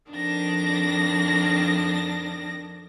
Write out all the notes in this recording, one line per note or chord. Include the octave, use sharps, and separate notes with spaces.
F2 D#3 D4 A#6